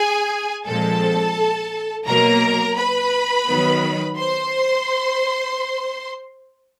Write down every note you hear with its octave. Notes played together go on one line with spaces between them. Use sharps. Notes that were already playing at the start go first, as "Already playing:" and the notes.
Already playing: G#4 G#5
A#2 F3 G#3 C4 A4 A5
B2 F#3 A#3 A#4 A#5
B4 B5
D#3 F#3 B3
C5 C6